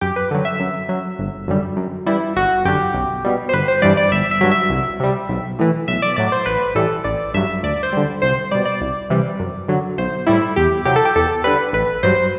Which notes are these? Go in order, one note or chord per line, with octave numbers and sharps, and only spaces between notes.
F#2 G4
B4
D3 F#3
E5
F#2
F#3
G1
F#2 D3 G3
F#2
E3 G3 E4
G1 F#4
F#2 D3 G4
B1
B2 G3
C5
G1 B4
C5
G2 E3 G3 D5
D5
G1 E5
E5
G2 F#3
E5
C2
C3 G3
B1
A2 E3
B1 E5
D5
A2 F#3 D5
C5
A1 B4
A2 E3 G3 A4
A1 D5
G2 F#3 E5
D2 D5
C5
D3 G3
C2 C5
B2 G3 D5
D5
C2
C3 E3 G3
F#2
D3 F#3
B1 C5
A2 G3 E4
E2 G4
C3 F#3 G4
A4
G4
E2 A4
D3 G3 B4
A1 B4
G2 F#3 C5